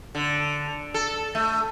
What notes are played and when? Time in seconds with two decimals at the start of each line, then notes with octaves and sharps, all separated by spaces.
0.15 D3
0.94 A4
1.35 A3